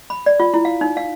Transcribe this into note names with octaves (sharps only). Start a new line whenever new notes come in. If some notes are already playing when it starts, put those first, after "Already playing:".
B5
D5
F4
E4
F5
D#4
F5